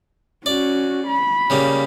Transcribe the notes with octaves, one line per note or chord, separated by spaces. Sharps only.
C#4 F#4 D5
B5
C#3 G3 A#3